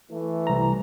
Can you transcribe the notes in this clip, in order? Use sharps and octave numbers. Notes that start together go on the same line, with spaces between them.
E3 A3
C2 A#5